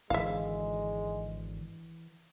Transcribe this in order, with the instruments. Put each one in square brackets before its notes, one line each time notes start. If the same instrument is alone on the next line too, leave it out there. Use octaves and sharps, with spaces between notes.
[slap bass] G#1 D3 [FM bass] E3 [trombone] G#3 [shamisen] E5 F5